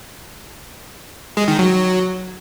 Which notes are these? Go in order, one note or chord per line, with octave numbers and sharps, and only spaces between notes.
G#3
D#3
F#3